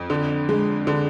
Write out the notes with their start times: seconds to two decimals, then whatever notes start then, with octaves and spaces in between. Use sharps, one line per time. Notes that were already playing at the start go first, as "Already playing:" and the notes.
Already playing: F2
0.10 D3
0.49 G#3
0.87 D3